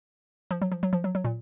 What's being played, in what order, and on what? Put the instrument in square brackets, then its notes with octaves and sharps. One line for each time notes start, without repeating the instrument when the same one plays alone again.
[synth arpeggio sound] F3
F#3
F3
F#3
F3
F#3
F#3
A#2